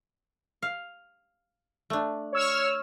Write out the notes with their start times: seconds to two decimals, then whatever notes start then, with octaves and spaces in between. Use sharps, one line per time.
0.62 F5
1.90 A3 D4
2.33 C#5 E6 F6